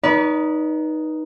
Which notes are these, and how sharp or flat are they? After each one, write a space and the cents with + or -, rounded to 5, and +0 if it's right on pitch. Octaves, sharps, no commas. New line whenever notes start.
D#4 +0 B4 -25 D5 -40